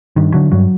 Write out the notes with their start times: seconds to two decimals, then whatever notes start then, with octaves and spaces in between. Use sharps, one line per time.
0.16 G2 D#3
0.34 D3 F#3
0.52 G2 F#3